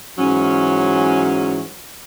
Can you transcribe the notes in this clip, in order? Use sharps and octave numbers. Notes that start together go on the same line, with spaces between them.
G#2 E3 F#3 C#4